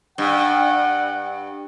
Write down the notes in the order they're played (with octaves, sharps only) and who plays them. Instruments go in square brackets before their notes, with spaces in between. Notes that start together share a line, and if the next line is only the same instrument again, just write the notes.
[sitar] G2 [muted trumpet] F#5